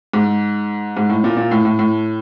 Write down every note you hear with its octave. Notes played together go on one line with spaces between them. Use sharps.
G#2
G#2
A2
A#2
A#2
A2
A2
A2